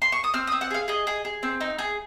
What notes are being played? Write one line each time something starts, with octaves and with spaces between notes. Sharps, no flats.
C6
C#6
D#6
C4 F6
D#6
C4
F#5
G#4 F5
G#4 D#5
G#4
G#4
C4
D#4
G#4